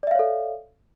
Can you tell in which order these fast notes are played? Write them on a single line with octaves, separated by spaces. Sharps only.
D5 E5 F5 C#5 A4